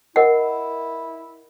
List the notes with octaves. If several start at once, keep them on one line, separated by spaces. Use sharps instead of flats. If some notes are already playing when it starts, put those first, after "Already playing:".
E4 A#4 D#5 F#5